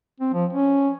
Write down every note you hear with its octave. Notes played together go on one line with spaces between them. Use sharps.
C4
F3
C#4